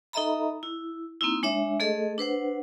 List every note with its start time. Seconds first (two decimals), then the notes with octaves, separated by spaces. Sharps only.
0.13 D#4 A4 D#5 E5 A#5 B5
0.63 E4
1.21 A#3 C4 D#4 E4
1.43 G#3 D4 C#5 E5
1.80 A3 G#4 A4 D#5
2.18 D4 B4 C5 F#5